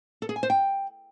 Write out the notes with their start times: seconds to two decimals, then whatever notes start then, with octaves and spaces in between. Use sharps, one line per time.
0.22 A4
0.29 G#4
0.36 G#5
0.43 C5
0.50 G5